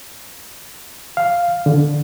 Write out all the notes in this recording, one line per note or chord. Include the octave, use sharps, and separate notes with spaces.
F5
D3